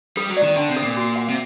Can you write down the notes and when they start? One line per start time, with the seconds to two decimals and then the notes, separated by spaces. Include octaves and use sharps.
0.17 G3 A4
0.29 F#3
0.37 D5
0.43 D#3
0.57 D3 G5
0.70 C3
0.76 A4
0.83 A#2
0.97 F#4
1.16 F#5
1.29 C3